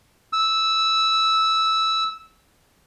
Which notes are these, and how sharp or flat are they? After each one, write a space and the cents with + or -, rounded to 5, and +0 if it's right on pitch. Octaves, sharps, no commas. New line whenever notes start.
E6 -10